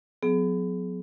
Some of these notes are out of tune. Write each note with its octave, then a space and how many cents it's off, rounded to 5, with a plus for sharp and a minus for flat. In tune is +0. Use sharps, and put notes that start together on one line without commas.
F#3 -30 B3 +30 G#4 +25